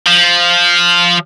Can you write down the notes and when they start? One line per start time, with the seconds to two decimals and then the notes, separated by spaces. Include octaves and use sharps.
0.07 F3